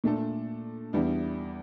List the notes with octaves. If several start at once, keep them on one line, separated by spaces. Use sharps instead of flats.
A#2 A3 D4 A4
E2 E3 G3 D4